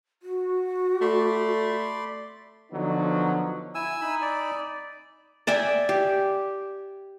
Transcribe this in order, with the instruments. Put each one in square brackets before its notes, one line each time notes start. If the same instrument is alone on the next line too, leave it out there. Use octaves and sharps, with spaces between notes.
[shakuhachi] F#4
[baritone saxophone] A3 [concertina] D5 B5 C6
[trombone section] D3 F3 F#3 B3 D#4
[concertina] E4 [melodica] G#5 E6
[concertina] D#4 B5
[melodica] D5
[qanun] D5 E5 G5 G#5
G4